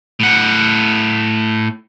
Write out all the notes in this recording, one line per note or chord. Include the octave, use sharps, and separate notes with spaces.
A2 F#5